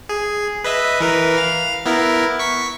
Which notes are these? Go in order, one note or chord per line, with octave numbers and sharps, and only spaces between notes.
G#4
B4 D#5 E5
E3 A#4 B4
F5 F6
B3 E4 A#4
C#6 B6